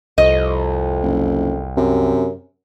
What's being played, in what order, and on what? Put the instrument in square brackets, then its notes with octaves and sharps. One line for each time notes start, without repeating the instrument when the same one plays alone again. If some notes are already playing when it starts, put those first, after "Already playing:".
[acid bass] C2 [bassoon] F2 [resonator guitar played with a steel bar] D#5
[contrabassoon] F#1
[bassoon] F#2 [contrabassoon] C3